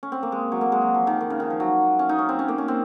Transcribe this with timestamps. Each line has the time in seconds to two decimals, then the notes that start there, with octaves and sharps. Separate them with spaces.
0.03 C#4
0.12 C4
0.23 A#3
0.32 G#3
0.52 F#3
0.61 A#3
0.72 G#3
0.82 F#3
0.94 F3
1.07 D#3
1.20 D#3
1.30 C#3
1.40 D#3
1.50 F3
1.60 F#3
1.99 C#4
2.09 D#4
2.18 C#4
2.29 C4
2.39 C#4
2.48 A#3
2.58 C#4
2.68 C4